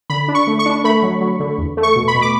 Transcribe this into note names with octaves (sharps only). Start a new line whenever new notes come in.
D3 B5
D4
C#6
A3
C#6
D4
A3 B5
F#3
F#3
D3
E2
A3
C#6
B2
B5
B2
D6